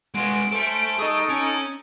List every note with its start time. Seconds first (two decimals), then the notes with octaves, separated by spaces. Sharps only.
0.15 G#3 B3 F4 F#4 C6 D7
0.53 C#4 A4 C5 E5
0.99 D#4 G#4 A4 D#5 C#6 D#6
1.29 C#4